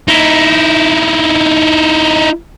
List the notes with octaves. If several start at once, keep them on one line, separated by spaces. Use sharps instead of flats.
D#4 E4